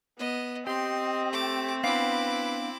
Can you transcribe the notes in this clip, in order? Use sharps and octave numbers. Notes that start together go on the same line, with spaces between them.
B3 D#5
C4 G4 D#5 C6
A3 A5 D6
B3 D4 E4 B4 F5 D6